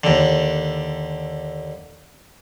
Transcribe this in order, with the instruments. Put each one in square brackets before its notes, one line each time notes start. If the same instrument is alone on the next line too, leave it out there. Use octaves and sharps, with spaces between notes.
[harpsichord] D#2 D3